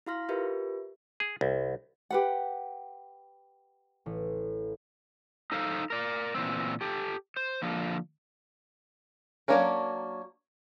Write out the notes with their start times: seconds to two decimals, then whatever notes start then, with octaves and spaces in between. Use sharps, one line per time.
0.06 E4 F#4 F5 C6 F6 A#6
0.29 F4 G4 A#4 B4 E5
1.20 G#4
1.41 C2
2.10 G4 B4 F#5
4.06 A1
5.52 D#4 A4 C5 F5
5.90 A#4 D5
6.35 A#2 E3 B3 C4
6.81 G4 A4
7.37 C5
7.62 D3 F3 A#3 D4
9.48 F#3 A#3 C#4 D4 A#4